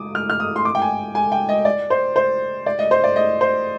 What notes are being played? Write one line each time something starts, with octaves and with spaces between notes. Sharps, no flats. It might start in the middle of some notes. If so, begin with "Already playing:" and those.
Already playing: D6 D#6
F6
F6
D#6
C6
D6
G5
G#5
G#5
G5
D#5
D5
C5
C5
D5
D#5
C5
D5
D#5
C5